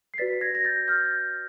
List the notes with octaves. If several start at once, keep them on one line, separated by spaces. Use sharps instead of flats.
C7
F#4 B4 D5 A6 B6
G#6 A#6
A#6
G6 A6
F6 G6